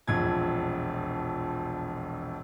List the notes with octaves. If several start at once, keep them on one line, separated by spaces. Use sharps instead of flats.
E1 A#1 F2 G#6